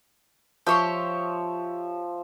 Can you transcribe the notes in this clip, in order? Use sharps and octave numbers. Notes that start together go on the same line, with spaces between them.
F3 G4 C#5 E5 C6 D6